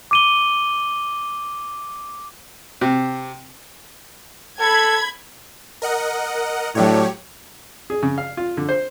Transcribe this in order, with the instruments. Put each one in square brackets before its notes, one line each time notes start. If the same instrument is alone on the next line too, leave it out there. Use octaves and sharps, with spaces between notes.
[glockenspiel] D6 D#7 G7
[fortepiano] C3
[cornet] A4 [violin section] B5 G#6
[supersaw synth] A#4 D#5 F#5
[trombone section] A2 D4 [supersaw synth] F#3 G4 C#5
[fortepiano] G#4
C#3
F5
F4
D3
C5